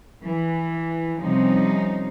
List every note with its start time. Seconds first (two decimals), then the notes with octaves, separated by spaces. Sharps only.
0.23 E3
1.20 C3 F3 G3 C#4 D#4